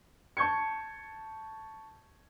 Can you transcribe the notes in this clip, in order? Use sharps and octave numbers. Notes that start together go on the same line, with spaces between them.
A5 C#6 G6 G#6 C#7